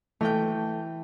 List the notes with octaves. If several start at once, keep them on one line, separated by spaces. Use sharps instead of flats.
E3 A3 G5 G6